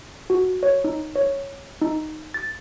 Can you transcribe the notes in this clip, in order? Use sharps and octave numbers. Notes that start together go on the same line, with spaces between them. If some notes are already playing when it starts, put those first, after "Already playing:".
F#4
C#5
D#4
C#5
D#4
A6